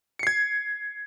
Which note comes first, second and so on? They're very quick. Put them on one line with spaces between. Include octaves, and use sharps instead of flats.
C#7 C7 G#6